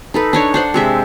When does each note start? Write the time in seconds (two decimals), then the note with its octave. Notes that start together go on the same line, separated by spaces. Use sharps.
0.14 D#4 A4 B4
0.33 D4 D#4 C#5
0.54 D4 C5 F#5
0.74 C3 G#3 E5